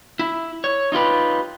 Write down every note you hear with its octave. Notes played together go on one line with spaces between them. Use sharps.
E4
C#5
D#4 F4 G4 B4